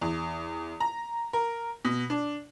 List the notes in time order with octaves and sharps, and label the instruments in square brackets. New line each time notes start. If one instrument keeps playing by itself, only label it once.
[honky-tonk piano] E2
A#5
A#4
B2
D4